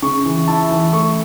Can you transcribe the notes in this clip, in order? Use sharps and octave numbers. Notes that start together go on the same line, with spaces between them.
C#3 C#6
E3
E4 A5
E3
A3 C#6